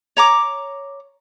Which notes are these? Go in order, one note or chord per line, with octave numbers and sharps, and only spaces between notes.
C#5 A#5 D6